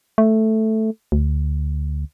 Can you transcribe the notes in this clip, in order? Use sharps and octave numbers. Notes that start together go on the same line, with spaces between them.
A3
D2